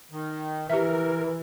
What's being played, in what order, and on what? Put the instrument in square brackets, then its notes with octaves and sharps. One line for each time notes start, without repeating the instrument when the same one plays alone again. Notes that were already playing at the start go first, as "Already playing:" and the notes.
[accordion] D#3
[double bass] E3 [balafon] G4 E5 [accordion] A#4